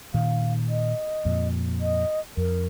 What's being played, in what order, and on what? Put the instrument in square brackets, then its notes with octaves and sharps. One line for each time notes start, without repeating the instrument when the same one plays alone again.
[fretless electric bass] A#2 D#3 [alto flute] F5
[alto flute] D#5
[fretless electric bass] F2 A#2
[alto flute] D#5
[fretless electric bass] F2 [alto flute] A#4